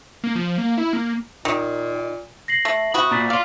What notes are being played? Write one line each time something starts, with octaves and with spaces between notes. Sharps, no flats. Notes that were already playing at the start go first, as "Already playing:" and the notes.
A#3
F3
A#3
E4
A#3
A#2 D#3
A#6 C7 F#7
A3
C3 F#4 B5 D#6
A#2 A#5 A6 B6
D5 F5 C6